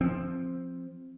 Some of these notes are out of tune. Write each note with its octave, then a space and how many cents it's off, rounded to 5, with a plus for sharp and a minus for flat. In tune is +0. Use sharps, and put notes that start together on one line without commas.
F3 +0 C4 +10